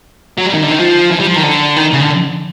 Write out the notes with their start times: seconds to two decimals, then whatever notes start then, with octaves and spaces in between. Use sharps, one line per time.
0.38 F#3
0.46 G3
0.54 D#3
0.63 D3
0.71 D#3
0.79 F3
1.11 E3
1.20 G3
1.27 F3
1.36 D#3
1.43 D3
1.76 D#3
1.93 C#3
2.01 D3